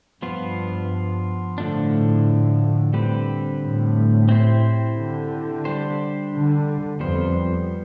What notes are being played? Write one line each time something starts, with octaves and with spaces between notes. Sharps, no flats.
G2 F3 B3 F4
A2 D3 F3 A3 D4
D3 G3 C4 G4 B4
A2
C4 E4 G4 C5
D3
G3 D4 G4 C5
D3
F2 G3 B3 F4 C5